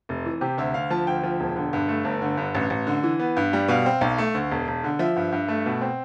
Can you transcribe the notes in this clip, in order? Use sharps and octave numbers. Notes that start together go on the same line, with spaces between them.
F1
E3
C3 G4
D2 E5
D2 F5
F3 A5
D2 G5
F3
E1
D3
G2
A3
G1
D3
G2
A1
A1
D3
E3
B3
G2
G3
B2 F5
C4
B1
A3
D2
E1
E1
D3
F3 E5
G2
G2
A3
B2
C4